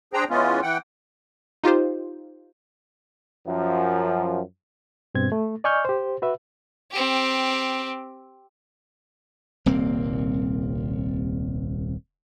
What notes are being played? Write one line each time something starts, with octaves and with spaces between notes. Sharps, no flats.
D4 G#4 C5 G5 A#5
E3 G#3 B3 C#4 F4
E3 F#5 G5
D#4 F4 G4 C5
F#2 F3
G2 B2 C4 G#6
A3
D5 D#5 G#5 C#6 F6 G6
G4 C5
F#4 B4 E5
C4 G4
D#1 C2 A#3 C4